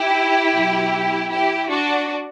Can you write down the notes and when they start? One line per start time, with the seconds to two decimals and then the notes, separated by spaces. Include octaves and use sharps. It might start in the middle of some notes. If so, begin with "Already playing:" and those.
Already playing: E4 G4
0.53 B2 F#3
1.31 E4 G4
1.70 D4 F#4